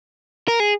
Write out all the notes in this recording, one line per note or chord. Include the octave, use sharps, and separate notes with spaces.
A#4
G#4